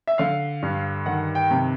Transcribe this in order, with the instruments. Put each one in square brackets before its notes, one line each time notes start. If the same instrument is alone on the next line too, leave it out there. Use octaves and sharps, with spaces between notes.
[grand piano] E5
D3 F5
G2
D#3 F#5
G5
C3